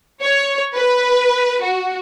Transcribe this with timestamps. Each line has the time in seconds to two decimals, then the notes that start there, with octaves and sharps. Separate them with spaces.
0.22 C#5
0.74 B4
1.62 F#4